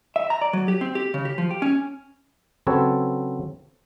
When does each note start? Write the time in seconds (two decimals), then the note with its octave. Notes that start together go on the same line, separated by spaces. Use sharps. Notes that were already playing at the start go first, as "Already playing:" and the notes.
0.16 E5
0.30 A#5
0.41 D5
0.53 F#3
0.68 G4
0.81 C4
0.95 G4
1.14 C#3
1.25 G4
1.38 F3
1.51 G4
1.62 C#4
2.67 C#3 F#3 C4 A4 B4 C#5